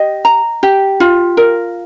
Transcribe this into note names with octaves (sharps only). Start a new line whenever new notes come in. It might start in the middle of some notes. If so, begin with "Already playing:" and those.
Already playing: G4 D#5
A#5
G4
F4
A#4